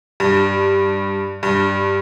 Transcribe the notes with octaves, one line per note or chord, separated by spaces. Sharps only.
G2
G2